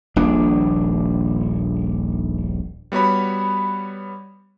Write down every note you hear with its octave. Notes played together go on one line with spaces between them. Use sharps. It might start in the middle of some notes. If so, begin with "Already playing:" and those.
D#1 A#1 D4
G3 B3 F#4 C#5 B5